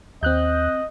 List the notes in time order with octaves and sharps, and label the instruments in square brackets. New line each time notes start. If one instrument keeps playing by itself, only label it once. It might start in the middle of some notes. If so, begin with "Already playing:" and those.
[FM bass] D#2 [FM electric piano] C4 F#6 G6 [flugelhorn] D#5